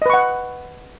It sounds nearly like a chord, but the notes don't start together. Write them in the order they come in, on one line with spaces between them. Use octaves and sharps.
D#5 B4 C#6 F#5